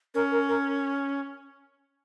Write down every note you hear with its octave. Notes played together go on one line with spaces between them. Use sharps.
C#4 A#4
A#4
A#4